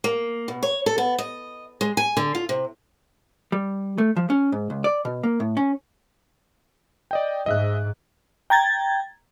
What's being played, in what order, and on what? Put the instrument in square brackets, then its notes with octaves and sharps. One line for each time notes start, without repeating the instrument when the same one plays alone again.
[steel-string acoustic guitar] A#3
B2
C#5
A4
B3
D#5
G#3
G#5
D3
F4
C3
[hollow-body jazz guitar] G3
A3
F3
C#4
G#2
C#2
D5
B2
A#3
A2
C#4
[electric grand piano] D5 D#5 G5
[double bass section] G#2 [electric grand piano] D#5 E5 F#6
[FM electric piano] G5 A#5 G#6 A6